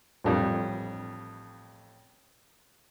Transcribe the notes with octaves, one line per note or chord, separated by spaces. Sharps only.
A1 F2 G3